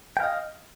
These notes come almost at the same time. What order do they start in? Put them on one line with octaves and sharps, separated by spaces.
G5 F5 D#5